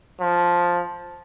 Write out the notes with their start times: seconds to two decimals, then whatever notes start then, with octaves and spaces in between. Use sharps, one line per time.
0.21 F3